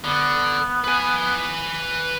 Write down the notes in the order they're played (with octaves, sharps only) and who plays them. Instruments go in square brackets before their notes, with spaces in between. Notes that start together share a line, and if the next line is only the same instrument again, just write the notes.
[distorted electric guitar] D3 [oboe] B3
[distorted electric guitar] B4 G#5